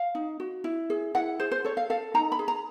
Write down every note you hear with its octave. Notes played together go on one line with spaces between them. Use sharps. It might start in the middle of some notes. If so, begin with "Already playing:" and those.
Already playing: F5
D#4
F#4
E4
G#4
E4 F#5
G#4 C5
C5
A4 C#5
F5
A4 F5
D#4 A#5
B5
G#4
A#5